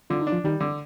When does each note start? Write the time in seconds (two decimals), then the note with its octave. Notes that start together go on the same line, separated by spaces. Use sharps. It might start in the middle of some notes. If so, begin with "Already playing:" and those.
0.10 D3 F4
0.21 D#4
0.27 D4
0.32 F3 F4
0.44 D#3 G3 D#4
0.61 D3